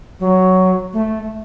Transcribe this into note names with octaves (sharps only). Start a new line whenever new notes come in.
F#3
A3